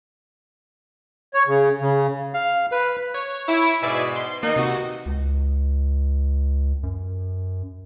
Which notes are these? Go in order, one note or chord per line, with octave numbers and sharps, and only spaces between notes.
C#5
C#3
C#3
F5
B4
C#5
E4
G#2 B2 D5 E5 G#5
C6
D#3 A#3 B3 D#4
C3 F#4
C#2
F#2